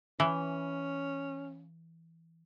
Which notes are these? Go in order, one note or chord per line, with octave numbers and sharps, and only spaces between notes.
E3 C#4